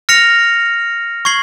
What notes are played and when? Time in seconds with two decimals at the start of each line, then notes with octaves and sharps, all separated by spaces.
0.09 F6 A#6 C#7 F7
1.25 C#6 G#6 C7 F#7